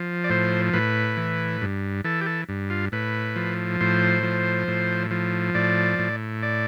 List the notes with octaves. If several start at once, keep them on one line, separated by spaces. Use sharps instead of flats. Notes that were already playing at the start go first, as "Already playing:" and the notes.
Already playing: F3
D5
A2 C5
A2 B4
E3
G2
E3 A4
G4
A4
G2
F4
A2 B4
F3
A2 C5
F3
A2
F3
A2 D5
A2
D5